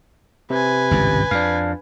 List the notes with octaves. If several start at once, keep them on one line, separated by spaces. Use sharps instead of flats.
C3 B4 G#5
G#1 C#2 G2
F2 D4 F5